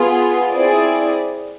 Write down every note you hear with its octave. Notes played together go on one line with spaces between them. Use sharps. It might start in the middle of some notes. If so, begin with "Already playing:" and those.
Already playing: B3 F4 G#4
C4 E4 G#4 D5